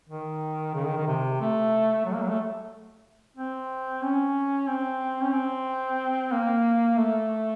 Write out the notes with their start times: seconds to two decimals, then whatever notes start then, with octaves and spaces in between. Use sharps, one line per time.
0.10 D#3
0.75 C#3
0.86 D#3
0.97 D#3
1.07 C3
1.41 A3
2.06 F#3
2.14 A#3
2.23 F#3
2.30 A3
3.37 C4
4.03 C#4
4.68 C4
5.22 C#4
5.33 C4
6.32 A#3
6.97 A3